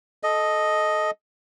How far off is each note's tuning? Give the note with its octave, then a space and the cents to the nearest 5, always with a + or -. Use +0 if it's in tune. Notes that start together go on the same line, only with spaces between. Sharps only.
A4 -20 D#5 +0